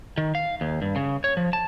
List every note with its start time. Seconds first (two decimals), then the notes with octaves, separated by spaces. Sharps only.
0.18 D#3
0.35 F5
0.61 D#2
0.82 G2
0.96 C#3
1.24 C#5
1.37 F3
1.53 A5